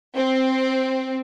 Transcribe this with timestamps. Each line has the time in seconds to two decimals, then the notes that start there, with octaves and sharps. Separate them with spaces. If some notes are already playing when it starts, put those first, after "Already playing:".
0.17 C4